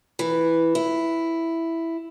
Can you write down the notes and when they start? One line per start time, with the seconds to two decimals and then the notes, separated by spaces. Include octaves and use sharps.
0.19 E3
0.75 E4